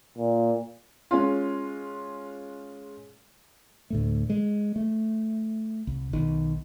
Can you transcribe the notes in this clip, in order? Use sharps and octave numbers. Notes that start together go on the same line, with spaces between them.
A#2
G#3 C#4 F4
D2 A2 A3
G#3
A3
C2
B1 D#3